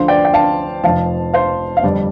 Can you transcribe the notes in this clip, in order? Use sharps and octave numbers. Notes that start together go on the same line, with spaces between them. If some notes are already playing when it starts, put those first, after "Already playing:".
Already playing: D2 D3 F3 C5 F5
D5 G5
G5
F5 A5
F1 F2 F3 F5 A5
C5 F5
F5
G1 F2 D3 G3 D5